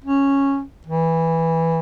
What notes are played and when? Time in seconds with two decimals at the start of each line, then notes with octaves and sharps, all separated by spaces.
0.05 C#4
0.87 E3